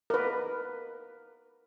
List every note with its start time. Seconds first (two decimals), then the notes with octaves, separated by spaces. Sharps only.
0.10 A#4 B4